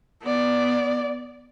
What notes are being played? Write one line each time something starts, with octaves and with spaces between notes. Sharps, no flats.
B3 D5